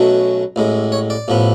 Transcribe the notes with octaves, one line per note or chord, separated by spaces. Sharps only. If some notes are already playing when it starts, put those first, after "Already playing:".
Already playing: B1 B2 F#3 A3 C#4
A1 A2 G#3
C#5
D5
A1 A2 F3 B3